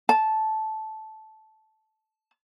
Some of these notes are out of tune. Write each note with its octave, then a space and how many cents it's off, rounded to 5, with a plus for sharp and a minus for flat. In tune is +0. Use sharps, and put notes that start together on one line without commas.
A5 -10